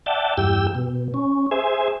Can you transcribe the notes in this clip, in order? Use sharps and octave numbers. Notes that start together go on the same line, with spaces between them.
D5 E5 F#5 G5 A5
E2 G2 G4 G5 E6
B2
C#4
G#4 C5 E5 G#5